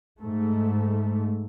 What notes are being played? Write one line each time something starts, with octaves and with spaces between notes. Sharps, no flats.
G#2 A3